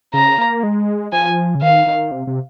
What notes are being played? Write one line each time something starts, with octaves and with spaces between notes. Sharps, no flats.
C#3 A#5
A#3
G#3
F3 G#5
C#3
D#3 F5
D#3
C3
C3